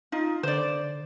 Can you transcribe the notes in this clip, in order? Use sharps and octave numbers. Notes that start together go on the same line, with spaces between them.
D#4 F4
D3 C5 D5